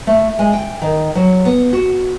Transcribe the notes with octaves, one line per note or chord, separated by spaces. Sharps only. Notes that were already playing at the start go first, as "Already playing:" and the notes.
A3
G#3
G5
D#3
F#3
B3
F#4